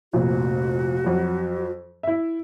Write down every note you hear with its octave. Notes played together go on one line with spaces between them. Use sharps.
F1 F2 A#2 F#4
F2 F#3
E4 E5